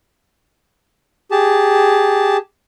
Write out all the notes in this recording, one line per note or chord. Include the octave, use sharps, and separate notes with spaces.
G4 G#4 A5